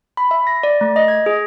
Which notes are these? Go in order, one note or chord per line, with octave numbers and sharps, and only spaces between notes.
B5
E5
A#6
D5
A3
D#5
G#6
G#4